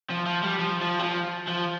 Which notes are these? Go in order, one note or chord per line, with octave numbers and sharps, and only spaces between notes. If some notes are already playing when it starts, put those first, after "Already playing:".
F3
F3
G3
F3
F3
G3
F3
F3